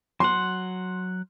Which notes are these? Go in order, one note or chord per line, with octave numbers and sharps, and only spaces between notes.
F#3 F#5 C6